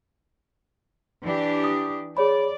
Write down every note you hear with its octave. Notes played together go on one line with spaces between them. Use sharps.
E3 D4 G4
D#6
G#4 C#5 D5 B5